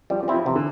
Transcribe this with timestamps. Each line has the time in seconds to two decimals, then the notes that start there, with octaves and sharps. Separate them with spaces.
0.10 F3 G3
0.23 F3
0.28 C4 E4
0.34 F3
0.45 C3 E3
0.56 D3